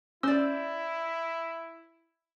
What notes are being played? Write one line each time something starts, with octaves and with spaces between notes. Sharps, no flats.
C#4 E4 C5 D5 E6